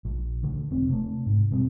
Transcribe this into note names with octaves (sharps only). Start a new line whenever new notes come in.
A#1
D2 D3
E1 C4
C3 A3
G#2
E1 B2 G3 C4